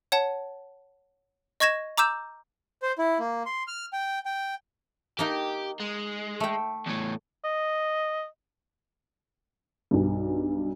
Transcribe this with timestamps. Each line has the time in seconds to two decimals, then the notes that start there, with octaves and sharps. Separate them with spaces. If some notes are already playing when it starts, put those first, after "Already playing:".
0.12 C#5 F#5 A5
1.60 D#5 C#6 G#6 A#6 E7
1.97 A#5 D6 E6 G6 E7
2.82 C5
2.98 E4
3.19 A#3
3.46 C6
3.67 F6
3.93 G5
4.25 G5
5.19 A#3 D#4 G4 A#4
5.80 G#3
6.40 A3 G5
6.86 E2 A2
7.44 D#5
9.91 B1 G2